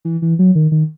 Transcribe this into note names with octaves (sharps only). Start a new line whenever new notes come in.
E3
E3
F#3
D#3
D#3